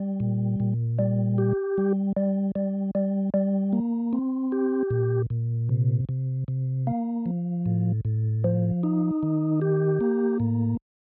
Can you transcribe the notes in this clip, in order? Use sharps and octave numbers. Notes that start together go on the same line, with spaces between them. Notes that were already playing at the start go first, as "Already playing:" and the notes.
Already playing: G3
A#2
A#2
G3
G4
G3
G3
G3
G3
G3
A#3
C4
G4
A#2
A#2
C3
C3
C3
A#3
F3
A2
A2
F3
D#4
D#3
G4
A#3
A2